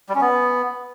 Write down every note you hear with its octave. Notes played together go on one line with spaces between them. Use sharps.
G3
C#4
B3